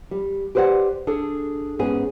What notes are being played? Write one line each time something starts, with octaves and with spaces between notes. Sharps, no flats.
G3
G4 B4 C5 D5 F#5
D4 G#4 A4
G#2 B3 C#4 G#4 G#5